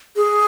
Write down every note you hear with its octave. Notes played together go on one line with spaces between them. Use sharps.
G#4